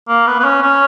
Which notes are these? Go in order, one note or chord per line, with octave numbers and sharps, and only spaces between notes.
A#3
B3
B3
C#4
C#4